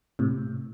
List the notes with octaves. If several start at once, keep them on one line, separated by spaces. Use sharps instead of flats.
A2 C3